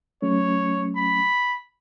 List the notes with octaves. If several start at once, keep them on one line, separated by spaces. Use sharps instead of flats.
F#3 A3 C#4 C#5
B5